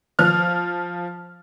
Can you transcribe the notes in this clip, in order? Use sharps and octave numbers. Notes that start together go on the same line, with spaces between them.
F3 F6